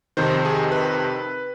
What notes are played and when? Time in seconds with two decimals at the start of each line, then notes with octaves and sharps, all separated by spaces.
0.17 F2 C3 D#3 C5
0.45 G#4
0.72 B4